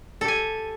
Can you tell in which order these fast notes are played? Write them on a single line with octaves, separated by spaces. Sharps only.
A4 G4 G#5